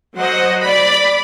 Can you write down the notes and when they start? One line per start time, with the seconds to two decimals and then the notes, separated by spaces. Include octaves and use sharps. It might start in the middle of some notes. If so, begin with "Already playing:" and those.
0.16 F#3 C5 D#5 F#5
0.63 D5 B5